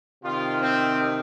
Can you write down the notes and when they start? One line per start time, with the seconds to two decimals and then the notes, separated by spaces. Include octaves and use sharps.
0.22 C3 D#3 F4
0.60 C4